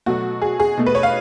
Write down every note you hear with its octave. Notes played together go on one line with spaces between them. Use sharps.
B2 F#3 A3 F#4
G#4
G#4
B2 A3
B4
C#5
F5